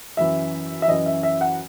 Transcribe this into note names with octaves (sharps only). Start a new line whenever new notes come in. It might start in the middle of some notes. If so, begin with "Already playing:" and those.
F#2 E3 E5
E5
F#2 E3 D#5
E5
E5
F#5